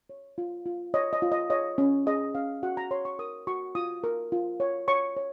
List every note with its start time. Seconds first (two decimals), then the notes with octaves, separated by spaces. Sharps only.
0.10 C#5
0.38 F4
0.66 F4
0.94 C#5 D#5
1.13 D#5
1.22 F4
1.32 D#5
1.50 C#5 D#5
1.78 C#4
2.06 G#4 D#5
2.35 C#4 F5
2.63 F#4 F#5
2.77 A#5
2.91 C#5 C6
3.05 C#6
3.19 A#4 D#6
3.47 F#4 C#6
3.75 F4 D#6
4.04 A#4
4.32 F4
4.60 C#5
4.88 C#5 C#6
5.17 C#5